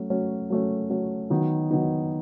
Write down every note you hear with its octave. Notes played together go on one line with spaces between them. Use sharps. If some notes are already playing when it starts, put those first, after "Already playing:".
Already playing: F#3 A3 C#4
F#3 A3 C#4
F#3 A3 C#4
F#3 A3 C#4
D#3 F#3 B3 D#4
D#3 F#3 B3 D#4